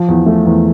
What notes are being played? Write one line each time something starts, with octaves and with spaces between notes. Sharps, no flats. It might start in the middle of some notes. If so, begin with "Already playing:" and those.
Already playing: F3
E2
A3
E2